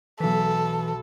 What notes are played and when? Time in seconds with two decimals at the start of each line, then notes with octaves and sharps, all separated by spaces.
0.20 B1 E3 A4 B6